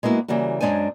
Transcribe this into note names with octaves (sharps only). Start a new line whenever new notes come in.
G#3 A#3 B3 E4 F#4
C#3 E3 G3 A#3 F#4
F#2 F#3 G#3 D4 C5 G#5